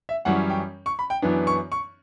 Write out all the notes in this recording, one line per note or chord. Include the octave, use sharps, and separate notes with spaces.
E5
F#2 E3 G3 C#4 F#5
G5
C#6
B5
G5
F#2 E3 B3 D4
C#6
C#6